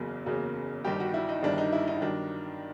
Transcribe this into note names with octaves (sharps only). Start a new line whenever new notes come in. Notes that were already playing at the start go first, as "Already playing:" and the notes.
Already playing: F#1 E2 C#3 F#3 A#3
F#1 E2 C#3 F#3 A#3
G1 G2 D#3 G3 G4
F#4
E4
D#4
G1 G2 D#3 G3 D4
D#4
E4
D#4
G2 D#3 F#3 D4